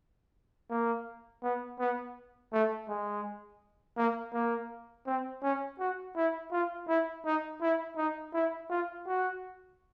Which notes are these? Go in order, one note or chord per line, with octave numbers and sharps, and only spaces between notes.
A#3
B3
B3
A3
G#3
A#3
A#3
C4
C#4
F#4
E4
F4
E4
D#4
E4
D#4
E4
F4
F#4